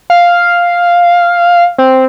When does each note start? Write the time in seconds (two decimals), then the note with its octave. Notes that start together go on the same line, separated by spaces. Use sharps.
0.10 F5
1.78 C4